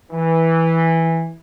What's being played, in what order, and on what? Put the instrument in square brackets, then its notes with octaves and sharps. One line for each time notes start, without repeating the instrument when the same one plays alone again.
[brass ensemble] E3